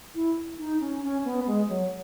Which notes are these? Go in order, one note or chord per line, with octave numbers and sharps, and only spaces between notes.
E4
D#4
C#4
C#4
B3
G#3
F#3